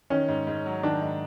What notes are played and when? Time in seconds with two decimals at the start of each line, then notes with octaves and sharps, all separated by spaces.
0.10 D#3 C#4
0.28 G#2
0.47 G#2
0.66 F#3
0.83 D#3 D4
1.02 G#2